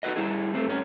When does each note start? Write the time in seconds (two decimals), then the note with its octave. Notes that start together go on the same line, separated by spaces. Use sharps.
0.03 D#4 F#4 A4 B4 D#5
0.16 G3 E4 G#4
0.54 A3 C4
0.67 G2 C#4